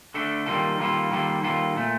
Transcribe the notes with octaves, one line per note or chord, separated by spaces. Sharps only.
D3 A3 D4 A4
D#3 G3 A#3 F4 A4
D#3 G3 A#3 F4 A4
D#3 G3 A#3 F4 A4
D#3 G3 A#3 F4 A4
A#2 A3